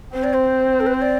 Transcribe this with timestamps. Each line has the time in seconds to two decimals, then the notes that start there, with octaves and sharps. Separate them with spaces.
0.14 C4 C5
0.24 D5
0.34 C5
0.80 A4
0.86 B4
0.94 C5
1.02 D5